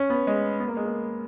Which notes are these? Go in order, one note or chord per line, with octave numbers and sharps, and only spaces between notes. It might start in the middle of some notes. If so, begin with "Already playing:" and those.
Already playing: C#4
B3
G#3
B3
A#3
G#3
A#3